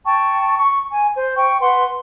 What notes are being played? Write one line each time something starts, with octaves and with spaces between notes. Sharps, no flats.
G5 A5 C#6
C#6
G#5
C5
G5 C#6
B4 F#5 C6